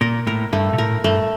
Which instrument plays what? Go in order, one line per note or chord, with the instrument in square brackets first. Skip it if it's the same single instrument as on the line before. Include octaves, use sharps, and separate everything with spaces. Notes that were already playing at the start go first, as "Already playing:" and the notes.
[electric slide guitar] A#2 [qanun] A#4
[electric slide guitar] A2 [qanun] A#4
[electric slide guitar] G2 [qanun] A3
[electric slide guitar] A#2
[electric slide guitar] A2 [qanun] A#4
[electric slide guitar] G2 [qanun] A3